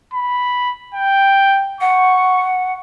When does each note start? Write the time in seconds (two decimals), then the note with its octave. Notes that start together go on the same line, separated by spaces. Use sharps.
0.14 B5
0.95 G5
1.81 F#5 C#6